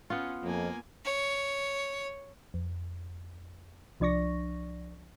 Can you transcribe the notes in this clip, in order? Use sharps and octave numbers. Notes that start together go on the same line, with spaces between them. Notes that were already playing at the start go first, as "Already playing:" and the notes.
B3 C#4 F4
F2 A#3 G#5
C#5
F2
C2 F3 D4 D5 C#6 A#6